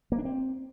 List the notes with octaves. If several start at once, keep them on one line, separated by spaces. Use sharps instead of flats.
A#3
D4
C4